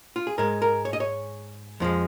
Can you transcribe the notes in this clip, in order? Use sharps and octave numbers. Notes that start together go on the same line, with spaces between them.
F4
G#4
G#2 G#3 A#4
A#4
C#5
D#5
C#5
F2 F3 G#3